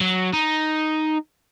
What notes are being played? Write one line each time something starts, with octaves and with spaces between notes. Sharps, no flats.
F#3
D#4